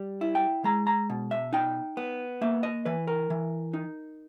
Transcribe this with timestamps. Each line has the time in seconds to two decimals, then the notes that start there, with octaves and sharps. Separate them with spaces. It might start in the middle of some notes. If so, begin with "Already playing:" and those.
Already playing: G3
0.21 E4
0.35 G5
0.64 G#3 A#5
0.87 A#5
1.10 B2
1.31 E5
1.53 D#4 G5
1.97 B3
2.41 A#3 E5
2.63 D#5
2.85 E3 B4
3.07 A#4
3.30 E3
3.73 D#4